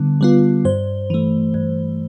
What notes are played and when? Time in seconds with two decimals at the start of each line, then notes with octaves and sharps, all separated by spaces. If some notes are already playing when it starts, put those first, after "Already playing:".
Already playing: D3 G3 B3
0.21 G3 B3 F4
0.65 G2 C5
1.10 E3 A3
1.54 G2